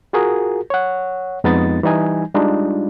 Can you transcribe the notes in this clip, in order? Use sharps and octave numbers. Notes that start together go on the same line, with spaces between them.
F4 F#4 G#4 A#4
C#5 F#5
F2 G#3 B3 D#4 A6
E3 G3 D#4 G#5
G3 G#3 D4 D#4 F4